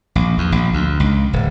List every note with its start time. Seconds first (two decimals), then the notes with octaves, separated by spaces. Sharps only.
0.15 A#1
0.38 E2
0.52 A#1
0.74 D2
1.00 C#2
1.33 D1